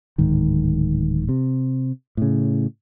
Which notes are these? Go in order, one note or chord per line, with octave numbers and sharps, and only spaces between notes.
D1 G#2 D#3
C3
A2 C#3